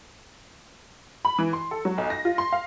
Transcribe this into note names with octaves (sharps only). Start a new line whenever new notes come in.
B5
E3
C6
A4
F#3
B1
A#6
F4
C6
F5